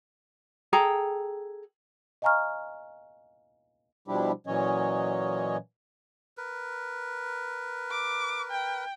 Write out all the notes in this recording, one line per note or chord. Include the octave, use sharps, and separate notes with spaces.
G#4 A4 G5 A#5
D#5 F5 G#5 A#5 C#6 F6
B2 F3 G3 D4 E4 G4
A#2 E3 F#3 C#4 C#5 D#5
A#4 B4
D6
G5